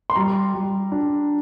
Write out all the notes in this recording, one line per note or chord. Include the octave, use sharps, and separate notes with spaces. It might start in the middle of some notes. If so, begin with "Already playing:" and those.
C6
G3 A#5
G3
D4